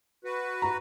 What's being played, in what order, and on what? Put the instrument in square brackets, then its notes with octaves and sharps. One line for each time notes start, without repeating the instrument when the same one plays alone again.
[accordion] F#4 B4
[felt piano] A#5